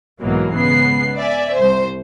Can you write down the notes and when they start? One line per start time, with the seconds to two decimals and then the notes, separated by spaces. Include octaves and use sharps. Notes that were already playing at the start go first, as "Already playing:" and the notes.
0.21 B1 G#2 B2 E3 F#3 A#3
0.54 G#2 C#3 B3 C7
1.16 D5 E5 G#5
1.56 C2 C5